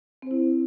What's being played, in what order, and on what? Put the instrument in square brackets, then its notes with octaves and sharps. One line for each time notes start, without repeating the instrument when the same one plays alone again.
[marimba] C4
C5
E4